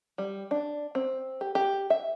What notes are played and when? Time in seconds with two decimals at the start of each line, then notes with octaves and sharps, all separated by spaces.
0.18 G3
0.51 D4
0.95 C4
1.41 G4
1.55 G4
1.90 E5